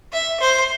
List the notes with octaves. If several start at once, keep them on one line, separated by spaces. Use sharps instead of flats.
E5
C5